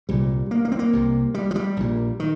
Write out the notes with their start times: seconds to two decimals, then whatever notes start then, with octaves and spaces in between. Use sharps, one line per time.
0.09 C2 A#2 G3
0.51 A#3
0.65 A#3
0.72 C4
0.79 A#3
0.93 C2 C3
1.34 G3
1.51 F3
1.56 G3
1.77 A#1 A#2
2.20 D#3